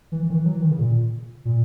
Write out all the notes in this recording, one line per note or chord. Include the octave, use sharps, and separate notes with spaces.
E3
E3
D#3
E3
F#3
E3
D#3
C#3
A#2
A#2